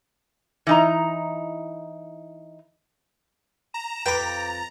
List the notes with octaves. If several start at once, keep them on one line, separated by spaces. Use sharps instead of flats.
E3 D#4 A#5
A#5 E7
F2 B4 G5 D6 A6